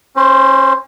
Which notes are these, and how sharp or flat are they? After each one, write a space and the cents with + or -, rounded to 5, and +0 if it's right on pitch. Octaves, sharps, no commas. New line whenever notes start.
C#4 -30 C5 +0